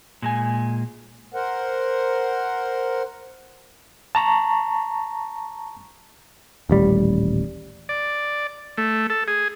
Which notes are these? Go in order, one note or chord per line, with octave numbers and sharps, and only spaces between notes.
A#2 G#3 G#5
A#4 C5 F#5
A5 A#5 C#6
D#1 A1 G3
D5
A3
A4
G#4